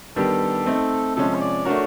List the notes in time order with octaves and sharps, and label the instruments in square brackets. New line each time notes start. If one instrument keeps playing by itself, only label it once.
[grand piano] D#3 G3 B3 D4 G4 [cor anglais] A4
[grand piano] A3 C4 D#4
[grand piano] C3 F3 G#3 C#4 [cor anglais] A4
[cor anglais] C#5
D5
[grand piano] A3 D4 F#4 A#4 [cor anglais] C#5